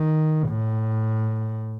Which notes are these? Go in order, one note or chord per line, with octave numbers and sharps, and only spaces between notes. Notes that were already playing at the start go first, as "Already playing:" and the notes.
Already playing: D#3
A2